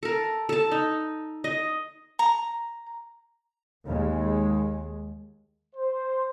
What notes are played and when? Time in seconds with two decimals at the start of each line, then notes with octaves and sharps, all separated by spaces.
0.03 A4 A#4
0.49 A4 A5
0.72 D#4
1.44 D#5
2.19 A#5
3.85 D#2 G#3
5.74 C5